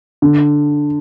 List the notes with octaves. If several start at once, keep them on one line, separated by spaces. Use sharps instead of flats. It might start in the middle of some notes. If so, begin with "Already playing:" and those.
D3